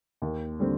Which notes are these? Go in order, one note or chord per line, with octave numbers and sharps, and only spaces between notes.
D#2
D3 G3 C4